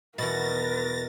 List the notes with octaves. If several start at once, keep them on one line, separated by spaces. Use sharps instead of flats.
E2 B2 A#4 B4 A6 A#6